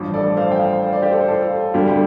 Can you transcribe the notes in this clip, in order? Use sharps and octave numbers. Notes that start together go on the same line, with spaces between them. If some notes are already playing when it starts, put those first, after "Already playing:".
Already playing: A1 G2 F3
A4 D5
C5 F5
G5
C5 F5
C5
D5
G4 C5
A4
C5
F4 A4
F4
D2 D3 G3 G4
G4